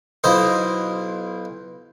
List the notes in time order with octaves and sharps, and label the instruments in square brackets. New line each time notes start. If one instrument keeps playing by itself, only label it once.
[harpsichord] B1 E4 F4 C5 D#5